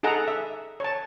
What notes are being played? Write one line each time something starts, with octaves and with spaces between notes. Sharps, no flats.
D#4 G#4 A4 F#5 A#5
E5
C#5 A5